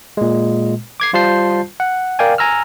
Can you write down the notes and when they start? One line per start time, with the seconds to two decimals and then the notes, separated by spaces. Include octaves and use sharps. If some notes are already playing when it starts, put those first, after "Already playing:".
0.17 A#2 G#3
1.00 D6 G#6 C7
1.13 G3 F4 C5 A5 G6 C7
1.80 F#5
2.19 A#4 D5 F5 G5 G#5
2.38 G#5 A#5 E6 F6